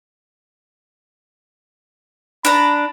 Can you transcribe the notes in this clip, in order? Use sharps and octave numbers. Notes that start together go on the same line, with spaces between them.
D4 A#5 B5